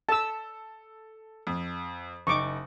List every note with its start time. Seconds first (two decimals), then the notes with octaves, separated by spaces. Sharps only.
0.09 A4 A5 E6 E7
1.47 F2
2.27 F#1 D#4 C#6 D6